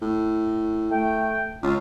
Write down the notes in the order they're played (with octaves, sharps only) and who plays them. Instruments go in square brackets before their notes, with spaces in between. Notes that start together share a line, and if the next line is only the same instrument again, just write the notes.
[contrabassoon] A2
[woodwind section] A3 G5
[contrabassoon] C#2 [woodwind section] C#4 F4